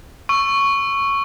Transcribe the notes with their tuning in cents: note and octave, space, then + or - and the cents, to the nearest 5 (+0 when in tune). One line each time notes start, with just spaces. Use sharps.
C#6 +0 E6 +15